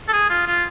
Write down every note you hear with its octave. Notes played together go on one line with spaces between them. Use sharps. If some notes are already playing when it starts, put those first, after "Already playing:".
A4
G#4
F4
F4